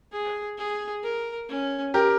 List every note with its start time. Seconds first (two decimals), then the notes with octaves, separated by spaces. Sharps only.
0.13 G#4
0.58 G#4
1.03 A#4
1.49 C#4
1.94 G4 A#4